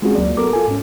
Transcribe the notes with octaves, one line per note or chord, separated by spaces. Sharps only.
G#3 C4 C#4 F4 F#4 G#4
D2 F#3 A#3 D5
B3 F#4 A4 A#4 D6
F4 A4 G#5
G#2 C#4